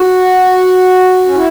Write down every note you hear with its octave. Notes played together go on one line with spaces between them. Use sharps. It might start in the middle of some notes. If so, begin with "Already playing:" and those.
Already playing: F#4
C#4
E4